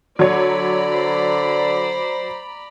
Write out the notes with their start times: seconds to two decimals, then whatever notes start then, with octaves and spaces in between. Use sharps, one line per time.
0.19 D3 F#3 C#5 D5 A#5 B5
0.91 C5